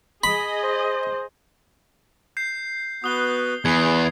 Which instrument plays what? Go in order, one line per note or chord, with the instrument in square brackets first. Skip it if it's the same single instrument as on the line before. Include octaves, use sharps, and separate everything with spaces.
[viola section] G#4 D#5 [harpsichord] B5
[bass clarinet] C5
[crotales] G6 C7
[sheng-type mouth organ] B3 F#4 B4 [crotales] D#6 G7
[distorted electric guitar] E2 [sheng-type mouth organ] G#4 B4 [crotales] G#6 C7